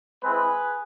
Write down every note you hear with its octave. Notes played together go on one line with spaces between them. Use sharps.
G#3 C4 E4 G#4 B4